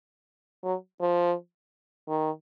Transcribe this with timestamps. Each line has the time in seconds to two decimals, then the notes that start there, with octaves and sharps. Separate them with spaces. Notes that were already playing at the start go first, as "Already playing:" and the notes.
0.64 F#3
1.01 F3
2.09 D#3